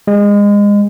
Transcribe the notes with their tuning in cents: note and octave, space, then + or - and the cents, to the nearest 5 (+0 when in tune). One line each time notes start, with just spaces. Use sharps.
G#3 -25